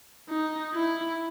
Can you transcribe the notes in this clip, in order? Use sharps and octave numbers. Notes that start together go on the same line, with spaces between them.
D#4
E4